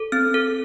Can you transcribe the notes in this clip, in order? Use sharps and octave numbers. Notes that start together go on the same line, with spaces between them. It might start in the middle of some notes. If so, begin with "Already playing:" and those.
Already playing: A4
C4 F6
A4